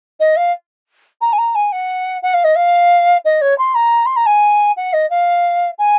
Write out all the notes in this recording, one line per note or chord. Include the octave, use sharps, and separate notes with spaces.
D#5
F5
A#5
G#5
A#5
G#5
F#5
F#5
F5
D#5
F5
D#5
C#5
C6
A#5
C6
A#5
G#5
F#5
D#5
F5
G#5